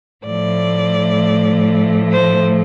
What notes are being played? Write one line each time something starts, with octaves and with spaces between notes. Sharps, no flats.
A2 F3 A3 D5
C5